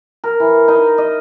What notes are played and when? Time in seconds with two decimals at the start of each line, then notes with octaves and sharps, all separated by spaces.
0.24 A#4
0.40 E3
0.68 D#4
0.98 D#5